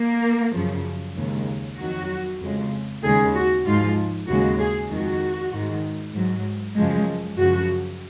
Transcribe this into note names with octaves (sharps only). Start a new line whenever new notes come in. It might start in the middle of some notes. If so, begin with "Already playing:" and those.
Already playing: A#3
F#2 C#3 F3
D#2 C#3 G#3
F2 D#3 F#3 F#4
F2 C#3 G#3
D#2 C#3 G#3 G#4
F#4
G#2 F3 G#3 F4
D#2 C#3 G#3 F#4
G#4
F2 D#3 G#3 F#4
G#2 D#3 G#3
G#2 F#3
F#2 C#3 F3 G#3
F#2 C#3 F3 F#4